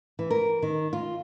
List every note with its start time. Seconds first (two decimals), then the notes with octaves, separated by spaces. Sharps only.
0.19 E3
0.30 A#4
0.62 D#3
0.93 F4